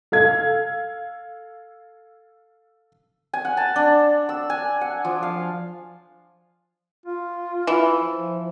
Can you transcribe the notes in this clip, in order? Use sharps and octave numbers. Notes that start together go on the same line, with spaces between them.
A4 F5 G#6
G#5
F#5
A5
D4
E6
G#5
F#5
F3
F5
F4
E3
F3